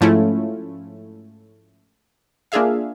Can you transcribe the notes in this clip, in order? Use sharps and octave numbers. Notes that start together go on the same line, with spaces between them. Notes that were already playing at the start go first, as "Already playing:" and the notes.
G#2 F3 A3 C#4 E4 F4
A#3 D4 F4 G#4 E5 F5